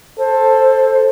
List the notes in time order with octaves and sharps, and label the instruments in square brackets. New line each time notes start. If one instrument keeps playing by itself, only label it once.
[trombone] A4 [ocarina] C5